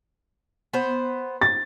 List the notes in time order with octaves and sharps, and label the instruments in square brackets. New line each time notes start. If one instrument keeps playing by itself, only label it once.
[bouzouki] B3 C5
[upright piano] A6